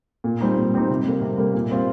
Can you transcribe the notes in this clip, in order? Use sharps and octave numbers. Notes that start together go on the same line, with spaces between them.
A#2
G3 C4 D#4
A#2
G3 C4 D#4
C3
G3 A#3
C3
G3 A#3
A#2
G3 C4 F4